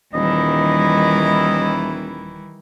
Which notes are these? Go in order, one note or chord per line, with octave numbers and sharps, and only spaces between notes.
D#1 D#3 E3 G3 E4 D#5